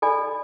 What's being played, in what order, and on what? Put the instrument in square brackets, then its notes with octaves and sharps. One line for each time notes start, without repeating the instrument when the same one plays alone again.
[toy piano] A4 D5 G#5 B5